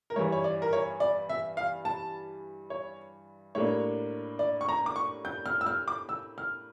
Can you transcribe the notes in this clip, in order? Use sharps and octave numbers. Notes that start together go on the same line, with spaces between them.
A#4
G2 E3 G3 C#5
C#5
D5
A#4
C#5
D5
E5
F5
A5
C#5
A2 G3 A#3 D4 C#5
D5
C#6
A#5
D6
C#6
G6
F6
E6
F6
D6
E6
F6